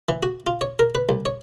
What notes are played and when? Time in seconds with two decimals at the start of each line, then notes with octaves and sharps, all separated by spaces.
0.09 E3
0.23 F#4
0.47 F4
0.61 C#5
0.79 A#4
0.95 B4
1.09 C2
1.25 C#5